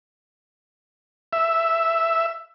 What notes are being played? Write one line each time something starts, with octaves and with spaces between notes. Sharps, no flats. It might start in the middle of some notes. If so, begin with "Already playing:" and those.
E5